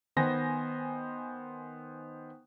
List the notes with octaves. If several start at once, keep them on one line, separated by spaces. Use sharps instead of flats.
D#3 B3 C5 G#5 A#6